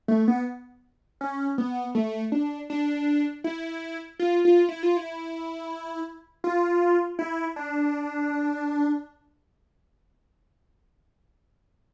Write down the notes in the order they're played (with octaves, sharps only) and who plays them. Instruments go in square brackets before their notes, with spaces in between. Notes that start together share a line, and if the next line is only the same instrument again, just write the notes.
[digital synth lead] A3
B3
C#4
B3
A3
D4
D4
E4
F4
F4
E4
F4
E4
F4
E4
D4